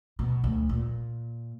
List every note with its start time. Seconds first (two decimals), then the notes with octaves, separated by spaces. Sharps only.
0.19 B2
0.44 D2
0.69 A#2